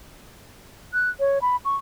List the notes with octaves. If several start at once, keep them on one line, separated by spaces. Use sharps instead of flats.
F#6
C#5
B5
C#6